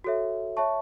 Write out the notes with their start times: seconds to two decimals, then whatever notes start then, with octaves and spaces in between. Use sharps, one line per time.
0.04 F#4 A4 C#5 E5
0.57 C#5 E5 A5 C#6